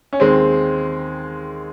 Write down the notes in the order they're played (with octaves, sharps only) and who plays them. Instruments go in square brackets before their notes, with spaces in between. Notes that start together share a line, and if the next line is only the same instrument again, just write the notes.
[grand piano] C#4
D#2 D#3 G#3 C4